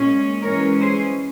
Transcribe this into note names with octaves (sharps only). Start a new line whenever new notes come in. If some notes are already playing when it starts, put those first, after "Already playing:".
Already playing: A#2 G#3 C#4
E3 G#3 C#4 A#4 C#5
G#4 C5